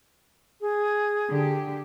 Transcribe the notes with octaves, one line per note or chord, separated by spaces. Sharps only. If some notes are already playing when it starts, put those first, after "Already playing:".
G#4
D3 G4